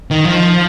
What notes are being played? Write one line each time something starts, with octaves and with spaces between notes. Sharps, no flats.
D#3
F3